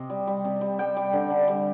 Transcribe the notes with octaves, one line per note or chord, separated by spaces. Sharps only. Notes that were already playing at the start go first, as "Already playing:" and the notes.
Already playing: C3 D#5
G3
G3
C3
G3
G3 G5
G3
D3
D3
G3